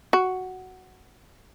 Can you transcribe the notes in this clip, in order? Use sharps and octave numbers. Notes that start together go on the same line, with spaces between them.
F#4